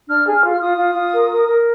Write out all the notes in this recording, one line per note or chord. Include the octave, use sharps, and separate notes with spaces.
D4 F6
G#4
F6
F4
F6
F4 D#6
F4
F4
A#4
A#4
A#4